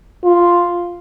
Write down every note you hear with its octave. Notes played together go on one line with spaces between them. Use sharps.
F4